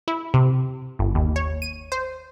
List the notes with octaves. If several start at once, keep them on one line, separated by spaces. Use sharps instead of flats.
E4
C3
G1
D#2
C#5
D#7
C5